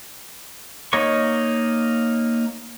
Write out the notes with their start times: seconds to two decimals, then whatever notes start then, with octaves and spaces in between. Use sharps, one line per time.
0.93 A#3 D#4 C#5 D#5 C#6